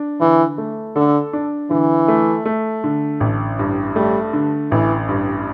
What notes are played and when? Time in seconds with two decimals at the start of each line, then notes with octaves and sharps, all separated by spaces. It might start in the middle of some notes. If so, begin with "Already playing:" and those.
Already playing: D4
0.21 D3 E3
0.58 A3
0.96 D3 A4
1.33 D4
1.71 D3 E3
2.08 A3
2.46 A3
2.84 D3
3.20 A1
3.59 G2
3.96 G3 A3
4.33 D3
4.71 A1 E3
5.09 G2